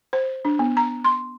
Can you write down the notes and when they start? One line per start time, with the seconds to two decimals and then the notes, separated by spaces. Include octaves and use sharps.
0.13 C5
0.45 D4
0.59 B3
0.77 A#5
1.04 C6